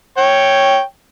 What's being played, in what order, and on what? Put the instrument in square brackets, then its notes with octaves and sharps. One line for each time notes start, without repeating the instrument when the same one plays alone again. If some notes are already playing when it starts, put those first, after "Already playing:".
[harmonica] C#5 G5